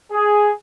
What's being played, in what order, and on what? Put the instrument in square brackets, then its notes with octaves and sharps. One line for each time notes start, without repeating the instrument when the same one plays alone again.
[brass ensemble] G#4